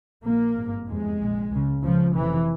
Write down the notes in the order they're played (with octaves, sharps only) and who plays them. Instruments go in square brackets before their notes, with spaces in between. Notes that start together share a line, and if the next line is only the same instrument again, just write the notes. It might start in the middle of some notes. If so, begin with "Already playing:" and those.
[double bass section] A#1 A#2 A#3
G#1 G2
F1 E2 C3 G#3
A#1 A#2
C#2 C#3
C#2 C#3 F3
F1 F2 C3 E3